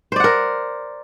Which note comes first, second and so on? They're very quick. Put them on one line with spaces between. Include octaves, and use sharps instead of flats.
C5 D5 F#5 A#4